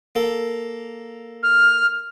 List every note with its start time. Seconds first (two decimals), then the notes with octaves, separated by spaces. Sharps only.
0.15 A#3 A4
1.43 F6